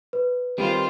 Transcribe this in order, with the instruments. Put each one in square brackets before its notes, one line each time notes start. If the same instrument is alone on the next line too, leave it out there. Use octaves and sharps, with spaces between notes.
[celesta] B4
[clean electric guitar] D#3 C4 [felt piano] G3 [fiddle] F4 C5